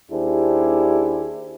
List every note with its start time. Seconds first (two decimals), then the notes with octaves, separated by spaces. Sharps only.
0.11 D#2 D4 E4 G4 G#4 C5